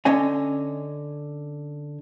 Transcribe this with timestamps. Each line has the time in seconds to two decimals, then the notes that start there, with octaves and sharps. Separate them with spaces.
0.05 D3 C#4 C#5 D#5 G#5